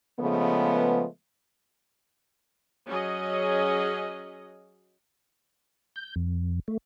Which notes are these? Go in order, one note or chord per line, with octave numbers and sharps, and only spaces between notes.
C#3 F3 G#3 A3 B3
F#3 C#4 G#4 D#5
G6
F2
A3